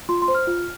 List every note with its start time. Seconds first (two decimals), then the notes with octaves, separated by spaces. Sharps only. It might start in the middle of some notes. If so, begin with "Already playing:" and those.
0.09 F4 C6
0.22 C6
0.28 C5
0.35 F6
0.47 F4